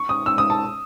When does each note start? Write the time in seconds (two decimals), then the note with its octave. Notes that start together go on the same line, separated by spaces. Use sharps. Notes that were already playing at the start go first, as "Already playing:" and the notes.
Already playing: C#6
0.09 D#6
0.26 E6
0.38 D#6
0.50 A5